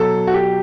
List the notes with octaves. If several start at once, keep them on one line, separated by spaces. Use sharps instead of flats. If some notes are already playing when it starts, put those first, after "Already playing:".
Already playing: B2 F#3 A4
F#4
G4